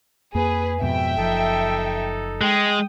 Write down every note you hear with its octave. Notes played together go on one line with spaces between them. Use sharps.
F2 A#3 G#4 B4
F2 G#2 B2 E5 G5
F#1 F3 D#4 A4
G#3 G5 D#6